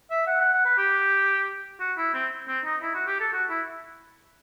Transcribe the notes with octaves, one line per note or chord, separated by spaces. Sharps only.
E5
F#5
F#5
F#5
B4
G4
F#4
E4
C4
C4
D#4
E4
F#4
G4
A4
F#4
E4